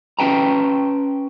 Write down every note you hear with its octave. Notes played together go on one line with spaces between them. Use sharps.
C#4 B4 G5 A5 A#5